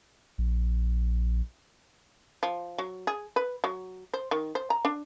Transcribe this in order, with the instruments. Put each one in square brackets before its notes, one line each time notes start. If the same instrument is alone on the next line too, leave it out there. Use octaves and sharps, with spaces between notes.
[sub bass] A#1
[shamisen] F3
F#3
G#4
B4
F#3
C5
D#3
C5
A#5
D4